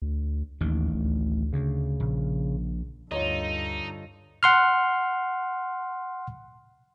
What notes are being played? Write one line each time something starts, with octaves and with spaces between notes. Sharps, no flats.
D2
A1 D#2 D#3
D2
D2 C#3
A#1
D2 G2 D3 D#4 F4 C#5 D#5
F#5 C6 F6